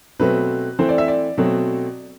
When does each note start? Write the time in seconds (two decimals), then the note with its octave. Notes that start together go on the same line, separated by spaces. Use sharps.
0.19 B2 F#3 A3 C4 B4
0.79 E3 A3 C4 C5
0.89 D5
0.98 E5
1.08 D5
1.38 B2 F#3 A3 C4